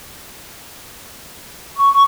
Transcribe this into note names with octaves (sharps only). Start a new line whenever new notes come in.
C#6